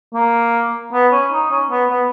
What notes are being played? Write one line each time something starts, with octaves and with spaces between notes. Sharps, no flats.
A#3
B3
C#4
D#4
C#4
B3
B3